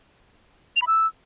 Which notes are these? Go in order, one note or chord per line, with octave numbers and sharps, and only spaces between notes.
F7
B5
E6